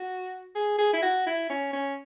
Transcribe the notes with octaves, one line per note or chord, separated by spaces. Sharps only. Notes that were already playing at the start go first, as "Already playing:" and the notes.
Already playing: F#4
G#4
G#4
E4
F#4
E4
C#4
C#4